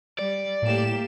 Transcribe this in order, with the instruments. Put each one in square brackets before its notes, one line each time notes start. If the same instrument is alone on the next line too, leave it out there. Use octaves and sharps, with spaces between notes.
[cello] G3 [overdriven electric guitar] D5
[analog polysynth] A2 E7 [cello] A#3 G4